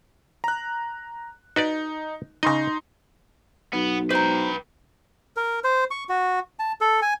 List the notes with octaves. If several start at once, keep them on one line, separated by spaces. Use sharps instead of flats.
A#5 F#6
D#4 F#4 B4 D5
C#3 D#4 D#5 C6 A#6
B1 B3
B4 C5 G5 A#5
A#4
C5
C#6
F#4
A5
A4
G#5